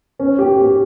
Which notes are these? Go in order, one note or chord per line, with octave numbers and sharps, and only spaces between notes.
C#4
G4
G4